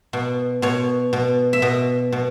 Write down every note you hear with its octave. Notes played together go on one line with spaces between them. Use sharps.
B2
B2 C#5
B2
E5
B2 D#5
B2